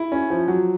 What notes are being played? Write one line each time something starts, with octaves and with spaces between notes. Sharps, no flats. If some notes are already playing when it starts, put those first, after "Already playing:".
Already playing: E4
C#4
F3
F#3